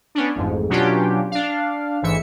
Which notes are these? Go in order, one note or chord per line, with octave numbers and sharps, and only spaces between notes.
B3 C#4 D4
A1 F2 G#2
B2 F#3 C#4 D4 F4 G4
D4 F5
A1 G#2 E3 E5 C#7